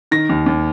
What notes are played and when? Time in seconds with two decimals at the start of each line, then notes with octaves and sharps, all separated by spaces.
0.11 D#3 A#6
0.29 D#2
0.46 D#2